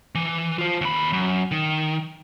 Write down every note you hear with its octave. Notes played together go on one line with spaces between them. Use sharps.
E3
F4 C5
D#2 B5
F#2
D#3